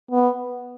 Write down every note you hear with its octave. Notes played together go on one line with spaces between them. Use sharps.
B3